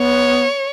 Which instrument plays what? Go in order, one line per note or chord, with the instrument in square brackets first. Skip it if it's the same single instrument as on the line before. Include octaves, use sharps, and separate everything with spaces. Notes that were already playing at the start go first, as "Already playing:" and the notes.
Already playing: [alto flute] B3 [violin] C#5